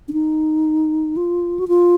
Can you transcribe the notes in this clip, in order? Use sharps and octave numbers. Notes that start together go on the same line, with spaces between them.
D4
D#4
F4
F#4
F4